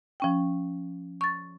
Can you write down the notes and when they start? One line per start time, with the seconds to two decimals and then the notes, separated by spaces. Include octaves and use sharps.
0.20 F3 C#4 G5
1.21 C#6 A6